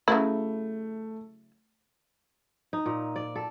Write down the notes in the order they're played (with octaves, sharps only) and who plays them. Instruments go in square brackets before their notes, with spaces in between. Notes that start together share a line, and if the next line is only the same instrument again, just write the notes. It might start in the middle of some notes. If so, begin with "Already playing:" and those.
[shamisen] C#3 F#3 E4 [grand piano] A3
[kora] D#4
A#2
D5
A4